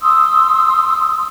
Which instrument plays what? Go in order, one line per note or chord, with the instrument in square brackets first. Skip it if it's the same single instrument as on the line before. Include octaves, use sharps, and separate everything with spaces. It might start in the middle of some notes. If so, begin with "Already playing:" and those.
[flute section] C6 D#6 E6